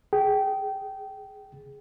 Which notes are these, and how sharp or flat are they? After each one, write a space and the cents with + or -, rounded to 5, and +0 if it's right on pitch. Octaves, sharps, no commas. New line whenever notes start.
G#4 +0 G5 -20